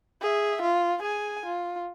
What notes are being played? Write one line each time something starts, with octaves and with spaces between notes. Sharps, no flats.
G#4 E5
F4
G#4 G#5
F4